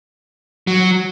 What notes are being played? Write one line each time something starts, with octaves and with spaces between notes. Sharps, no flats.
F#3